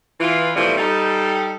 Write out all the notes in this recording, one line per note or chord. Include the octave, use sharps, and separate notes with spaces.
E3 F4
B2 E3 F3 G3 A3 C4
G3 D#4 A4